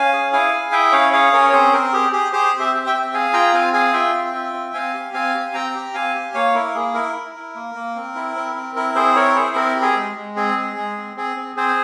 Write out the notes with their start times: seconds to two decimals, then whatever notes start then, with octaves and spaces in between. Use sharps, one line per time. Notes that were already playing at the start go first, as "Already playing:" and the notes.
Already playing: C#4 F5 G#5
0.13 G#4
0.32 E4 F5 G#5
0.53 G#4
0.72 E4 E5 G5
0.92 C#4 C#5 F5
1.13 G#4 C#5 F5
1.33 C#4 A#4 C#5
1.49 C#5
1.52 C4 G#4 C5
1.72 C4 A#4
1.92 G4 G#4
2.12 G4 G#4
2.33 G4 G#4 C5
2.54 C4
2.60 C5 E5
2.74 G4
2.87 E5 G5
2.94 C4
3.14 G#4 F5 G#5
3.33 F4 G5 A#5
3.54 C4 F5 G#5
3.73 G#4 F5 G#5
3.93 F4 E5 G5
4.14 C4
4.34 F4
4.54 C4
4.74 C4 F5 G#5
4.94 G4
5.14 C4 F5 G#5
5.35 G4
5.54 C4 G5 A#5
5.75 G4
5.94 C4 F5 G#5
6.15 G4
6.34 A#3 C#5 F5
6.54 E4 A#4
6.75 A#3 G#4
6.94 E4 A#4
7.15 E4
7.36 E4
7.55 A#3
7.75 A#3
7.96 C4
8.15 E4
8.36 C4
8.55 C4
8.76 E4 A#4
8.95 C4 G#4 C5
9.16 E4 A#4 C#5
9.35 E4 G#4 C5
9.55 C4 A#4
9.75 G4
9.82 G#4
9.96 G#3
10.16 G#3
10.36 C4 G#4
10.57 G#3
10.77 G#3
10.97 C4
11.16 C4 G#4
11.37 C4
11.56 C4 G#4 C5